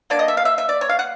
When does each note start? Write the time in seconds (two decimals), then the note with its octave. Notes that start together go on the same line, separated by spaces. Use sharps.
0.10 F#3 A#3 D4 D5
0.19 D#5
0.28 E5
0.37 F5
0.45 E5
0.58 E5
0.69 D5
0.81 C#5
0.89 F5
0.99 F#5